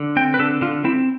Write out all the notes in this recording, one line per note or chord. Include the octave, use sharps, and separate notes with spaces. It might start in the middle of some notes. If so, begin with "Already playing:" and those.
Already playing: D3
C4 G5
B4
D3 A4
D3 F4
C4 E4